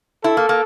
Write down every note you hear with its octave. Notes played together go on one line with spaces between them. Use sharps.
E4 A4
A#3
A#3